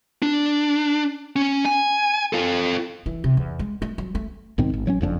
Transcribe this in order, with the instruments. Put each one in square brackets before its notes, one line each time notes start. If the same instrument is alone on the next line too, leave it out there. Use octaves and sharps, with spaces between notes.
[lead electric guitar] D4
C#4
G#5
F4 A4
[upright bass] E3
C3
E2
G#3
A3
F#3
A3
[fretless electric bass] B1 G#2 D#3 C4
G#1
A1 F#3 A3 C#4
F#1 F2 C4 D4